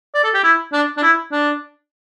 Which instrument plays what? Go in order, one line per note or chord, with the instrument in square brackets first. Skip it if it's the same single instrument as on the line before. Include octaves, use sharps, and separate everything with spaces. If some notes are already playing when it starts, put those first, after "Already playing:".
[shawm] D5
A4
G4
E4
D4
D4
E4
D4